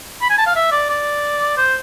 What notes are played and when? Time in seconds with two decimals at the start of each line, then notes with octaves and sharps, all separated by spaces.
0.22 B5
0.30 G#5
0.38 A5
0.46 F5
0.56 E5
0.72 D5
0.90 D5
1.57 C5